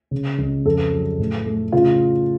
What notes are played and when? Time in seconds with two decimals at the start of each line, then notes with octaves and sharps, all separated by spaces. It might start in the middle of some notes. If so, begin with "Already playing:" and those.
0.11 C#3
0.39 C#2
0.65 F2 A4
0.92 F#3
1.19 A2
1.46 A3
1.72 C#3 F4